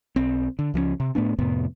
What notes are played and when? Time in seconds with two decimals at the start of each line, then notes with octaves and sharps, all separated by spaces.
0.16 B1 C4
0.59 D3
0.74 C#2 F3 F#3 C#4
1.00 C3
1.15 A2 A3 B3 D4
1.39 F2 A2 C3 B3